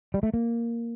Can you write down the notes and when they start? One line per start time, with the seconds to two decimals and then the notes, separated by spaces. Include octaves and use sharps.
0.14 G3
0.23 A3
0.34 A#3